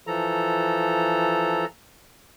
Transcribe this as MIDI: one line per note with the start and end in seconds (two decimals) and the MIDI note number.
0.07 1.65 52
0.07 1.65 53
0.07 1.65 69
0.07 1.65 82